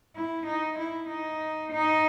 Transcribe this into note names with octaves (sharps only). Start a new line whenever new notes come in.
E4
D#4
E4
D#4
D#4